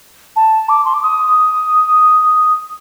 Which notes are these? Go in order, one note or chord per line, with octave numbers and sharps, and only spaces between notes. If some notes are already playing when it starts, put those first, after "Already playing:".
A5
D6
C6
D6
D#6